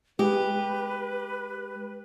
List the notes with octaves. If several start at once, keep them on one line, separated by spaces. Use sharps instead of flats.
G#3 G4 B4